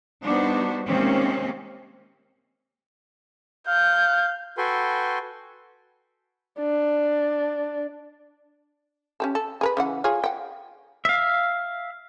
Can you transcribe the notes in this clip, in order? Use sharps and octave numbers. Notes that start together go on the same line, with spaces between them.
G3 B3 D4 D#4 F#4 C5
C3 D#3 G#3 A#3 C4 C#4
F5 G6
F#4 A4 B4 G5 G#5 C6
D4
C#4 G4 A4
A4
G#4 A#4 B4
C#3 E3 F#5
F4 G#4 C#5
F#5 G5
E5 F5